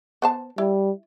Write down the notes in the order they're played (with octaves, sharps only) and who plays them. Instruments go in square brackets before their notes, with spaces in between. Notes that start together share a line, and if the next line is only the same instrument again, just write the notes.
[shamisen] B3 C5 A5
[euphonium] G3 [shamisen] E4